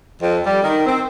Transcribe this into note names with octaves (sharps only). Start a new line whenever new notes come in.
F2
G3
D#3
C4